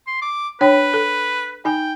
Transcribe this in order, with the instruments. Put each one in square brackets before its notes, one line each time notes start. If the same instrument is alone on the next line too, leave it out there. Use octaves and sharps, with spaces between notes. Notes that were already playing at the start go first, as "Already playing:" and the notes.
[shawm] C6
D6
[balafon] D4 C#5 G5 [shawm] B4
[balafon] A4
[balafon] D#4 G#5 [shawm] G5